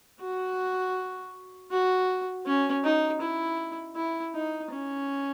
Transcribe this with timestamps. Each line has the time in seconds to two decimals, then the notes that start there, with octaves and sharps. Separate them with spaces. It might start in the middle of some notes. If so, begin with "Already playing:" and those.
0.20 F#4
1.71 F#4
2.46 C#4
2.84 D#4
3.21 E4
3.95 E4
4.34 D#4
4.71 C#4